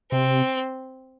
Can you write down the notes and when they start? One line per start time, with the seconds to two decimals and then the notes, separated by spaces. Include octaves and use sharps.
0.12 C3 C4